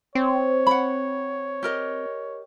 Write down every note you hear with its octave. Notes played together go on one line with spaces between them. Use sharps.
C4 C#5
F#5 B5
G4 A#4 D#5